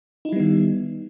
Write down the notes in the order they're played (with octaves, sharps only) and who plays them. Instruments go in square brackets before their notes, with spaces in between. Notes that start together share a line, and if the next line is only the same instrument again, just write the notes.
[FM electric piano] D#4
E4
G3
B3
D#3